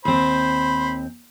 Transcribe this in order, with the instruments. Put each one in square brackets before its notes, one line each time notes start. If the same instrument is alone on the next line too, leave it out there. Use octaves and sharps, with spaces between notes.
[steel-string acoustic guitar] D#2 C4 [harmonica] C5 B5